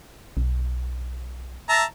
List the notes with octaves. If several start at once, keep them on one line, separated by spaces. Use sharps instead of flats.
B1
E5 A5 A#5